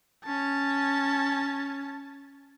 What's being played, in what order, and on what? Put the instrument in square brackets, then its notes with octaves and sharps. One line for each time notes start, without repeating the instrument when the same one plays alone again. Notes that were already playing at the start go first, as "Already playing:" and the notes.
[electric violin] C#4 A5